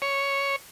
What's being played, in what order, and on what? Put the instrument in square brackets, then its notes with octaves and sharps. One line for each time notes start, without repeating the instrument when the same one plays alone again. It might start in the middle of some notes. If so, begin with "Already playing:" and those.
[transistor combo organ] C#5